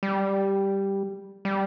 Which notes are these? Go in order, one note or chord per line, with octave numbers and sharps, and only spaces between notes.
G3
G3